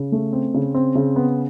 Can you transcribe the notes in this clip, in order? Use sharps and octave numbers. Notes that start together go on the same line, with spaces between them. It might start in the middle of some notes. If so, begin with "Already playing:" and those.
Already playing: C#3
A3
C4
C#3
C4
C#3
B3